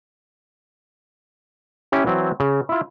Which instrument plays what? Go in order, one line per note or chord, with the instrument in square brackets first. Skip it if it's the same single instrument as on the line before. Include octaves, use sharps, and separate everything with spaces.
[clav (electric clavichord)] C#4 E4 G4
E3 F#3 C4
C#3
E4 F4